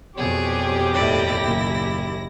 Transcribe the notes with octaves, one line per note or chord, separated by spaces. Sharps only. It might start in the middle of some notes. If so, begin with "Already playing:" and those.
F2 B2 G4 G#4 C#5 D5
D#2 A2 E4 D5 A#6
F#1 A#2